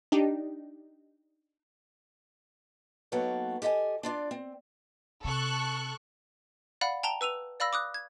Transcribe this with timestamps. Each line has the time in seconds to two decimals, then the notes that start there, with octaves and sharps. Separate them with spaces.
0.12 D4 D#4 G4
3.12 D#3 F#3 A#3 B3 A4 C#5
3.62 G4 A4 D#5 F5 G#5
4.03 D4 F4 D5
4.31 C4
5.24 C3 A4 C#6 F#6
6.81 D5 F5 F#5 B5
7.03 G5 A5 A#5 D7 F7 G7
7.21 B4 E6 D#7 F7
7.60 D5 F5 B5 E6 A#6
7.73 D6 D#6 F#6
7.94 G#6